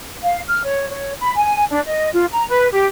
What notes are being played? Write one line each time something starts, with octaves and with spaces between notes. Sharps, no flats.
F5
F6
C#5
C#5
B5
G#5
D4
D#5
F4
A#5
B4
G4